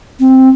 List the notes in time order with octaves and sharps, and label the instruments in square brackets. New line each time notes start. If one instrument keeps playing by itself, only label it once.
[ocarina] C4